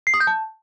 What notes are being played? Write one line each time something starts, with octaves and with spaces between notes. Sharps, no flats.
C7
D#6
G6
A5